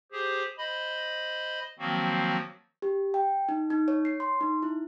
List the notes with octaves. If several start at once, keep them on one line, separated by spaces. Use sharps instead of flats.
G4 G#4 C5
C5 D#5 B5
D#3 F3 F#3 A#3 C4 F#4
G4
G5
D#4
D#4
C#5
C7
C6
D#4
E4